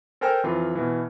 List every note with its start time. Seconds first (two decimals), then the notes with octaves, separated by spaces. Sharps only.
0.21 A4 A#4 C5 G5 G#5 F6
0.44 F2 E3 F4
0.75 B2 E3